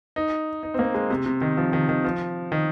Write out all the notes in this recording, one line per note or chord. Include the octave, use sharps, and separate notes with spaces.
D#4
D#4
C4
A#3
G#3
C3
C3
D#3
F3
D#3
D#3
F3
D#3